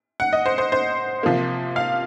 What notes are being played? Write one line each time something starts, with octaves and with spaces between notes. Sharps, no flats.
F#5
D#5
C5
C5
C5
C3 F3 A#3
F5